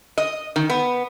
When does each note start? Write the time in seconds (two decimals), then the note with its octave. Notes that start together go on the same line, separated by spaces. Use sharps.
0.18 D#5
0.56 D#3
0.70 B3